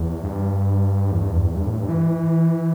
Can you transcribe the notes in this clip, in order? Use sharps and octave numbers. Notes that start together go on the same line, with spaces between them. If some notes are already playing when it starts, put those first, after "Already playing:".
Already playing: E2
G2
E2
G2
E2
G2
A2
G2
E3